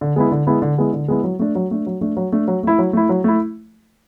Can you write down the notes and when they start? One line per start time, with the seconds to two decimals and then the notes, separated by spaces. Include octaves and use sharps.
0.01 D3
0.16 G#3 B3 E4
0.31 D3
0.47 G#3 B3 E4
0.62 D3
0.78 G#3 B3 E4
0.93 D3
1.08 G#3 B3 E4
1.24 F#3
1.39 A3 D4
1.55 F#3
1.71 A3 D4
1.86 F#3
2.01 A3 D4
2.17 F#3
2.32 A3 D4
2.48 F#3
2.63 A3 E4
2.79 F#3
2.93 A3 E4
3.09 F#3
3.24 A3 E4